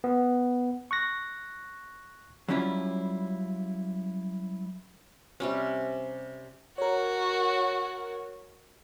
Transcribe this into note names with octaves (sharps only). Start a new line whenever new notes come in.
B3
C#6 F#6 A#6
F#3 G3 C#4 E4 F4
C3 G3 C#4
F#4 A#4 C#5